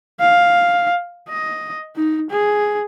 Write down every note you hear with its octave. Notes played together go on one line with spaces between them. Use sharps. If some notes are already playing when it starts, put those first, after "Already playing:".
F5
D#5
D#4
G#4